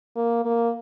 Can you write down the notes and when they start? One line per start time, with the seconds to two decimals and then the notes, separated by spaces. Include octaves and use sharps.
0.16 A#3
0.45 A#3